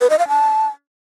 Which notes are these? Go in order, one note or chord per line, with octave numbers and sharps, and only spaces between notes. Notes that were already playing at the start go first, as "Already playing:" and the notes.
B4
D#5
F5
A5